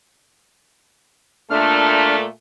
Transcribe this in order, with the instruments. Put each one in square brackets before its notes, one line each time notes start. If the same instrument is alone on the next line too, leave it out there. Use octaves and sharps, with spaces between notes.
[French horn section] A#2 A3 [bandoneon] D4 F6